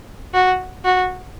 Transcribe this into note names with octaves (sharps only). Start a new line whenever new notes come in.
F#4
F#4